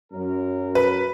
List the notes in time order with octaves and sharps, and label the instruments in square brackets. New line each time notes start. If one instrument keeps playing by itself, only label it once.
[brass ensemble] F#2 A#4
[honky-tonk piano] B4